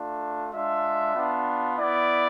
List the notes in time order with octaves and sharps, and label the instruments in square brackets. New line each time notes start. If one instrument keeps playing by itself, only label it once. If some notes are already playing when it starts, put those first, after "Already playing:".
Already playing: [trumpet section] A3 D4 F4
G#3 D4 F4 E5
B3 D4 F4
B3 E4 D5